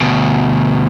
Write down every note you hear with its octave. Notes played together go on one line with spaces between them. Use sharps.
D2 B2